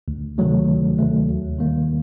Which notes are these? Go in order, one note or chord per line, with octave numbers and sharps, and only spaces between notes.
D2
C3 D#3 F#3 A3
D2
C3 D#3 F#3 A3
D#2
D#3 G3 A#3